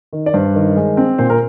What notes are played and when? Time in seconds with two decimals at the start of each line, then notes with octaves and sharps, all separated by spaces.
0.13 D#3
0.26 D5
0.34 G2 C5
0.55 D#3
0.76 G#3
0.97 C4
1.19 A#2 C5
1.30 A#4